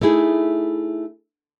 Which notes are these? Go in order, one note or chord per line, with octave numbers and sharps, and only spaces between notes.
A3 D#4 E4 G#4